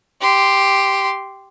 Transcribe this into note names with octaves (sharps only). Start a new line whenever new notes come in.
G4 C6